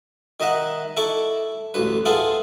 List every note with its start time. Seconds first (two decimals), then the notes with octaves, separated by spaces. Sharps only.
0.40 D#3 D#4 D#5 E5 F#5
0.97 E4 A4 C#6 D6
1.74 A1 D2 B4
2.05 B3 E4 F4 G#4 A4